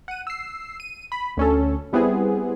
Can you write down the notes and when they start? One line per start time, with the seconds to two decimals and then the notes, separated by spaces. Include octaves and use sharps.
0.08 F#5 D#7
0.27 E6 C7
0.80 D#7
1.12 B5
1.37 D2 C#4 A4
1.93 G3 B3 C4 E4 G#4